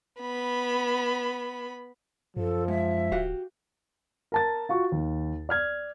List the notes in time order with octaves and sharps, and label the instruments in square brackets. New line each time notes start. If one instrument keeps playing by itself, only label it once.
[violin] B3 B5
[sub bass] F#2 [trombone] F3 [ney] A4
[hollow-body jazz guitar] G#2 [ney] E5
[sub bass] D1 [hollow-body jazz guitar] F#4 G4 F5
[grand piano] A#4 A5 A6
F4 F#4 C#6
D#2
D5 F6 G#6